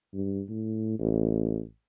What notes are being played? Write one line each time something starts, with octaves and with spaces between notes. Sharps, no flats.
G2
A2
A1